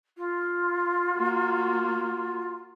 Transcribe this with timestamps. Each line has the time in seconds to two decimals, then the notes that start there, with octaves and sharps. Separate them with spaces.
0.17 F4
1.13 A#3 F#4